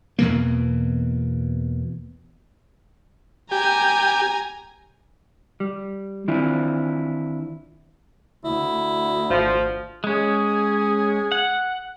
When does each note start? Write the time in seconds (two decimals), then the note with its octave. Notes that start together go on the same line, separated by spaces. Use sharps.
0.19 E2 B2 E3 A#3
3.51 G4 G#5 A#5
5.60 G3
6.28 D#3 E3 C4 D4 E4 F4
8.44 D2 E4
9.30 G#1 F3
10.04 G#3 C#4 G#4
11.32 F#5